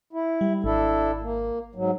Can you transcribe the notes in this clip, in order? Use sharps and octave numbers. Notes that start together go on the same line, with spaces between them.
E4
G3
G#1 D4 E4 A4
A#3
G#2 F#3